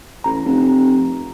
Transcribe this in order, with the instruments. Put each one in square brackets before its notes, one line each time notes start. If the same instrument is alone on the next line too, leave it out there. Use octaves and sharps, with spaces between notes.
[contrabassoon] A1 [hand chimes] A#5
[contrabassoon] F1